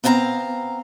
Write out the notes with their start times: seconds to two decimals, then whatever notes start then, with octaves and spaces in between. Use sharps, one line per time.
0.04 B3 C4 F5 A5 A#5